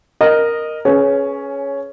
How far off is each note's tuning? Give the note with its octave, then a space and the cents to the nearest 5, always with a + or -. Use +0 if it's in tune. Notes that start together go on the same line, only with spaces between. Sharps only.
A#4 +0 D#5 -15
C#4 +0 G#4 +25 B4 -10